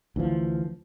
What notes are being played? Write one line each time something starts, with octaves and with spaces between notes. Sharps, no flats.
D2 E3 F3